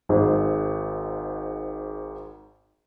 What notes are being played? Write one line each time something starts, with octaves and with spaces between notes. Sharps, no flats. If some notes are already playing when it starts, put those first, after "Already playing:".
G#1 G#2